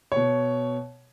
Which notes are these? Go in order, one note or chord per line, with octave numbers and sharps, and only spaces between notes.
B2 C#5